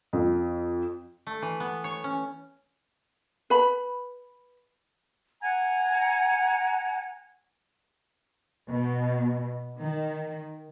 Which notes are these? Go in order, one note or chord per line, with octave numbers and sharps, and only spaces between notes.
F2
A3
E3
B3
C#5
C#4
B4 B5
F#5 G#5 A#5 G#6
B2
D#3